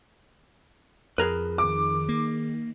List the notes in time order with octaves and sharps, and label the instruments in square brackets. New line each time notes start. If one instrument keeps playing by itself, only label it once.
[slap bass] F2 [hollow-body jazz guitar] G#4 A#4 B4
[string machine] D#3 [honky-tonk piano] D6
[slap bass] A#3